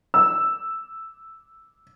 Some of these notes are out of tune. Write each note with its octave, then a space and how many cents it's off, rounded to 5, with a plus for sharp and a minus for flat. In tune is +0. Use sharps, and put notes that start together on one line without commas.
E6 +0